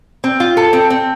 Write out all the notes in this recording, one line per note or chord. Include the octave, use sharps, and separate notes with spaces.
C4
F4
A4
C4
C4